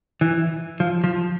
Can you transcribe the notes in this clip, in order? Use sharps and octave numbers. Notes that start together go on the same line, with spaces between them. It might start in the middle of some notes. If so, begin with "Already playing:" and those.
E3
F3
F3